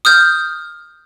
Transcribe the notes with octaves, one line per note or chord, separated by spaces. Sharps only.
D#6 F6 G6